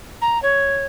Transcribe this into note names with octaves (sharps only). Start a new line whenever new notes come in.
A#5
C#5